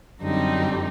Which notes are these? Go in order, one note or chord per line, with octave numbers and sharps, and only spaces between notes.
F#2 D3 G3 C4 D#4